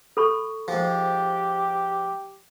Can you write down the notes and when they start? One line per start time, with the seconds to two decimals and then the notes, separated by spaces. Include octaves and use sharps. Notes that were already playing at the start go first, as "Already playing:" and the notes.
0.17 A4 B5 C#6
0.68 G#2 F3 G4